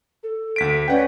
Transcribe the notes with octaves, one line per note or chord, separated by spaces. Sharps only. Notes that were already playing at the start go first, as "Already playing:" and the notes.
A4
D2 B6 D7
C#4 B4 D5 F#5 G5